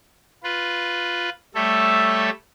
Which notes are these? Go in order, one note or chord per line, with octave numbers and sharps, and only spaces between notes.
F4 B4
G3 A3 A4 C#5 E5